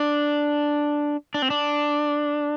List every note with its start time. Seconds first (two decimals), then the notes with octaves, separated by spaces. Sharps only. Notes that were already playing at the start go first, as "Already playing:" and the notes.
Already playing: D4
1.34 D4
1.42 C4
1.50 D4